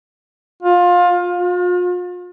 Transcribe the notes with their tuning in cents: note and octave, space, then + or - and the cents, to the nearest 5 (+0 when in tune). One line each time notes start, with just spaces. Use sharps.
F4 +20
F4 +40